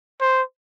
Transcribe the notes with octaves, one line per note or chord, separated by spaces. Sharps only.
C5